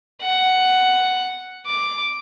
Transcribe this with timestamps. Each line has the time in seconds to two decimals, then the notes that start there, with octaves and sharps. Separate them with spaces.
0.22 F#5
1.66 D6